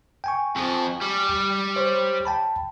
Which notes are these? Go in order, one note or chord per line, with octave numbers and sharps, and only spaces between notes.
G5 G#5 C#6
F2 F3
G3
C5 C#5
G5 A5 B5